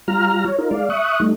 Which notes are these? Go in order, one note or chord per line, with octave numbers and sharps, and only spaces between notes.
G3 F4 A#5 F6
C#5
D#4 F4 A#4
G#3 D5 F5
E5 C#6 D#6 F#6
G3 A3 D#4